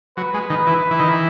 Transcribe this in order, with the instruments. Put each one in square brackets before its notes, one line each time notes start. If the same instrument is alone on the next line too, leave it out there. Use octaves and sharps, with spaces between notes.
[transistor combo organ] F#3 [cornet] B4
[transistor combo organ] G#3
D#3
E3
E3
D#3
E3